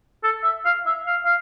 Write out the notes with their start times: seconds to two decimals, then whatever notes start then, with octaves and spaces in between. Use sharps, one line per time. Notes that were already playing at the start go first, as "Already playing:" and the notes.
0.24 A4
0.44 E5
0.65 F5
0.86 E5
1.06 F5
1.25 F5